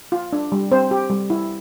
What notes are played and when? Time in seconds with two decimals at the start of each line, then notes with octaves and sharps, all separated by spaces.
0.12 F4
0.33 D4
0.52 G3
0.72 C4 C5
0.91 G4
1.10 G3
1.30 E4